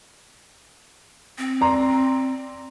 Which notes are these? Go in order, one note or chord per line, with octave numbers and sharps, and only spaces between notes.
C4
D5 A#5 C6